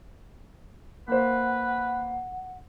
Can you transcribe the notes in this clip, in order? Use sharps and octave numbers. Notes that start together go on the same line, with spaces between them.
A#3 B4 C5 F#5